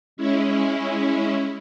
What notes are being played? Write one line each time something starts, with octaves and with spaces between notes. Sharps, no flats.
G#3 C#4 E4